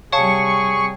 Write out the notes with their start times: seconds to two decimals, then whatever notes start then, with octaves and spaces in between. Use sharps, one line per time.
0.13 C3 G3 G#4 C#5 F5 A5 C#6